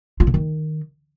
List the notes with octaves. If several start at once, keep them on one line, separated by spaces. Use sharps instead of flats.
F4
D3
D#3